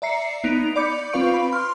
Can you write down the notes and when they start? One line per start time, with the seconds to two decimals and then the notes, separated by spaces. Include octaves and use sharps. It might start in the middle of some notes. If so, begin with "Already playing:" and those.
0.02 D5 E5 A#5 C7 C#7
0.44 B3 D#4 D7 F7
0.76 D5 B5 D6 G6 C#7
1.13 C4 F4 B4 F5 C#6 D7
1.34 B5
1.52 C6 F6